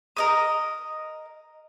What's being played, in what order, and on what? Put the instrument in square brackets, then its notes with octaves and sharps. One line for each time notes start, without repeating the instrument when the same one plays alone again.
[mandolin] A#4 D#5 D#6